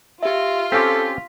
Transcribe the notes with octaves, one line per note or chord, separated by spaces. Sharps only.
F4 G4 E5
C4 C#4 G4 A4 B6